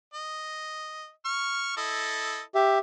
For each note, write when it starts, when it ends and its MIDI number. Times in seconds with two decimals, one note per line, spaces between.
0.14 1.10 75
1.25 1.76 85
1.25 1.76 89
1.77 2.41 64
1.77 2.41 69
1.77 2.41 75
2.55 2.78 67
2.55 2.78 76